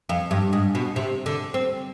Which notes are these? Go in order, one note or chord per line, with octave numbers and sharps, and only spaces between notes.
F2
G2
G#2
B2
C3
D3
C4